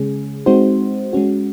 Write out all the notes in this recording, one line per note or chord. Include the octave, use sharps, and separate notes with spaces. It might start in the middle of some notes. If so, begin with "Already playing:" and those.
Already playing: C#3 G#3 C#4 G#4
G#3 C4 D#4 F#4 C5
G#3 C#4 F#4